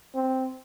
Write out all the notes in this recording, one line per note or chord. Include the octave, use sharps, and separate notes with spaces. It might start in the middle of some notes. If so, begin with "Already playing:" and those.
C4